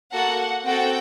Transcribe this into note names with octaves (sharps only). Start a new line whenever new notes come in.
A#3 F#4 A4 F#5
C4 F#4 A4 G5